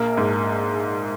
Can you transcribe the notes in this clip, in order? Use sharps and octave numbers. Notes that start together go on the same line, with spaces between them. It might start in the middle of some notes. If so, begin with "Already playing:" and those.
Already playing: A#1 A#3
G#2